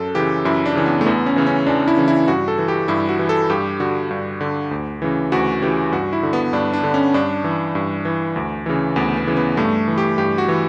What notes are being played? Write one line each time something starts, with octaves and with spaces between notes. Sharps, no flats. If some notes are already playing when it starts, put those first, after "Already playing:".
Already playing: F#2 A4
C#3 E3 G4
F#2 E4
D4
C#3 E3
B3
A3
E2 B3
C#4
C#3 E3
C#4
E2 D4
E4
C#3 E3
E4
G2 F#4
A4
E3
G4
G2 E4
F#4
E3
A4
G2 G4
D3 F#4
G2
D3
D2
C#3 E3
D2 F#4
C#3 E3 G4
G2 F#4
E4
D3
B3
G2 D4
D4
D3
C#4
G2 D4
E3
G2
E3
D2
C#3 E3
D2 B3
B3
C#3 E3
B3
G2 A3
E3
G4
G2 G4
F#4
E3